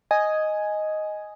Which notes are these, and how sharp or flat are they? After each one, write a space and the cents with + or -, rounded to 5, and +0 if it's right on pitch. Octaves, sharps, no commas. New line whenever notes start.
D#5 +0 G#5 +5